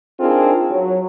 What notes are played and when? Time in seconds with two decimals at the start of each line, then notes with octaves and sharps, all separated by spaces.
0.19 C4 D4 D#4 F4 G#4 A#4
0.70 F#3